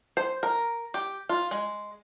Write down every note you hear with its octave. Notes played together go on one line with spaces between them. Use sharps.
C5
A#4
G4
F4
G#3